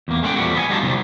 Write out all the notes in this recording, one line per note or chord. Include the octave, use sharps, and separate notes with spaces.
E2 A#3
G#3 A3 C#4 F#5 G5
B1 E2 F3 G3 A3 F#4
B3 D#5 G#5
G3 A3 D#4 F4 F#4 A5
C3 D#3 F#3 G3